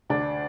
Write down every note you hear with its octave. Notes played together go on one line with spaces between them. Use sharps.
D2 D4